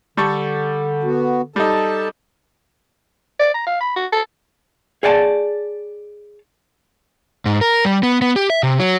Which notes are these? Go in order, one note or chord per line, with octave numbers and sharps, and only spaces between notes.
D3 G3 A4 C#6
B3 F#4
G3 D#4 A4 A5
D5
A#5
F5
B5
F#4
A4
G#4 C#5 D5 G#5 A5
G#2
A#4
G3
B3
B3
G4
E5
C3
F#3